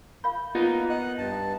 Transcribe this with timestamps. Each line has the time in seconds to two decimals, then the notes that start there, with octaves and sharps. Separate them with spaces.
0.24 F5 B5 G6
0.55 A#3 B3 D#4 F4 D5
0.90 D#5 F#5 F#6
1.18 G2 A5